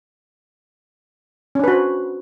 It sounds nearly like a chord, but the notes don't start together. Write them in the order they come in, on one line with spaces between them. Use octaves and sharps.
C#4 D4 B4 F#4 C5